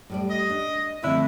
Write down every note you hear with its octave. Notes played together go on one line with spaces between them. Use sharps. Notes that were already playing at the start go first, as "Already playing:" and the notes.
A2 G3 D5
D#5
D4
B2 D3 F3 A3 C4 E4